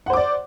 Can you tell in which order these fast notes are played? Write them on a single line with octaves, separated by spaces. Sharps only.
F#5 C5 D6 D5